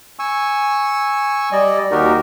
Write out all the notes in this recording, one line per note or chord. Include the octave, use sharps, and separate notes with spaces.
G#5 C#6 E6
G3 D5 D#5
D#2 D#4 F#4 G4 A#4